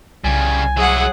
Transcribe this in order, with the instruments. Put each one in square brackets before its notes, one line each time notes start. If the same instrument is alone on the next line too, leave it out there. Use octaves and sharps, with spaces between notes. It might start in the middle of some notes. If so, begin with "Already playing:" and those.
[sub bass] C2 [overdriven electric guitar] C#3 G3 [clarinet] G#5
[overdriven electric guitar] F#3 E4 [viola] G#4 F#5